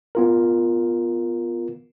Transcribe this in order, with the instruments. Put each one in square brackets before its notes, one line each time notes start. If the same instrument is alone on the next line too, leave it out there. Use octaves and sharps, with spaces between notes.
[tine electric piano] B3 F4 A#4